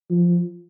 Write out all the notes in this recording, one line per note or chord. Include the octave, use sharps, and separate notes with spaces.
F3